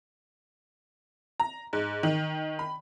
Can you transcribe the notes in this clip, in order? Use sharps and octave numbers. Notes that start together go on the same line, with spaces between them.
A#5
G#2
D#3
B5